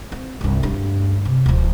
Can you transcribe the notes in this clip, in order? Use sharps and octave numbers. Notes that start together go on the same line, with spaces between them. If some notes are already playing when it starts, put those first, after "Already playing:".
C4
C2 G2
D2 G2
C3
D1 F3